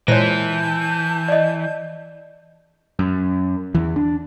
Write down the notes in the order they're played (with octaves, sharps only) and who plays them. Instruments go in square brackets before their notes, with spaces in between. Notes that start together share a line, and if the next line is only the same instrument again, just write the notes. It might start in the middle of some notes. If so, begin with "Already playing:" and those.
[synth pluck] A#2 G#3 A#6 [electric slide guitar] E3 [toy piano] C5 C#5 [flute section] A5 G6
[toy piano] D5 D#5
[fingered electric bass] F#2
E2 E3
D4